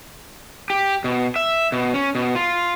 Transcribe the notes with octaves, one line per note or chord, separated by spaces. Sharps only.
G4
B2
E5
B2
C#4
B2
F4